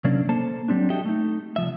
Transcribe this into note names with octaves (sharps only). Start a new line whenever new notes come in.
C3 F#3 A#3 C#4 D4
A#3 A4 C5 A5
F#3 G3 C4 D4
F#4 G4 A4 D#5 E5 G5
A3 D#4
C2 F3 E5